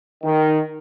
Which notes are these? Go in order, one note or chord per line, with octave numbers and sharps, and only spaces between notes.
D#3